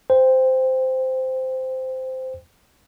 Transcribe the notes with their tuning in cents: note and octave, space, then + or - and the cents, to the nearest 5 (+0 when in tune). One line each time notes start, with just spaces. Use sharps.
C5 -10 G5 +20